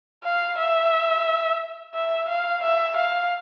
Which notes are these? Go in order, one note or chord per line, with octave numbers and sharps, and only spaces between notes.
F5
E5
E5
F5
E5
F5